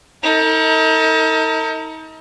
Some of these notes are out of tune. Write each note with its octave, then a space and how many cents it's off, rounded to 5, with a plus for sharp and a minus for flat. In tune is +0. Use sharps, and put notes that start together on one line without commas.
D#4 +40 A#4 -45